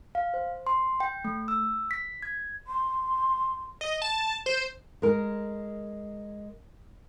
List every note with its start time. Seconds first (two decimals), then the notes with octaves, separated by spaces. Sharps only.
0.15 F5
0.34 C5
0.67 C6
1.00 G5
1.24 A3
1.48 E6
1.91 B6
2.22 G#6
2.67 C6
3.81 D#5
4.02 A5
4.46 C5
5.02 G#3 A#4